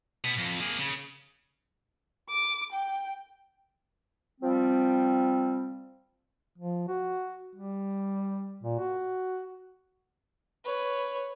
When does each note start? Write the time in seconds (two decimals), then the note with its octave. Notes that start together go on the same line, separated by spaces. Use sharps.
0.24 B2 B3
0.38 F2
0.60 A#3 G#4
0.79 C#3
2.29 D6
2.72 G5
4.41 F3 G3 C4
6.58 F3
6.88 F#4
7.55 G3
8.63 A#2
8.80 F#4
10.65 B4 C#5